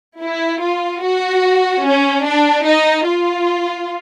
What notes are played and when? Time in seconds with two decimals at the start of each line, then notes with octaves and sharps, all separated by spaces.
0.21 E4
0.62 F4
1.03 F#4
1.85 C#4
2.25 D4
2.65 D#4
3.06 F4